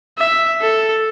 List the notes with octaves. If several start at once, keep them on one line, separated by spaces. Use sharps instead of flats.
E5
A4